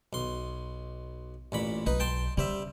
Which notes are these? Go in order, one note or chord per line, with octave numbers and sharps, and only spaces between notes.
B1 C6
A1 A#2 B5
B1 D#4 B4
G5 A5 C6
C#3 G3 C5 E5